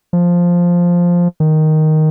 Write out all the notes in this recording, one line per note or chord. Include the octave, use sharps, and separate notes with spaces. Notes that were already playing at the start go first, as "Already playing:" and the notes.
F3
D#3